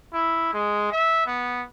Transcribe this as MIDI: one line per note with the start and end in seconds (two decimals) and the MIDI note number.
0.13 0.52 64
0.53 0.89 56
0.92 1.25 76
1.26 1.63 59